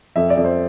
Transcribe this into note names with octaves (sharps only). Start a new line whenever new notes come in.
F2 E5
D5
F2
C5